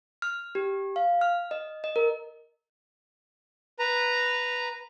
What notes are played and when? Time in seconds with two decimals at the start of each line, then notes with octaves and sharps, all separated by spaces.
0.22 F6
0.55 G4
0.96 F5
1.21 F6
1.51 D#5
1.84 D#5
1.96 A#4
3.79 B4 A#5